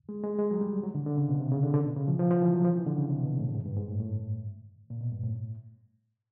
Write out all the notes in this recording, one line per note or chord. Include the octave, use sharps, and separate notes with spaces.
G#3
G#3
G#3
F#3
G3
F#3
D3
D3
C#3
B2
C3
C#3
D3
D3
B2
C#3
F3
F3
F3
E3
F#3
F3
E3
D3
C#3
C3
B2
A2
G#2
G2
G#2
A2
A2
A#2
B2
G2
A2